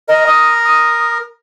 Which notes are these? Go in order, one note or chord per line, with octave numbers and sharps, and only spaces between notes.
A#4 D#5
D#6
D#6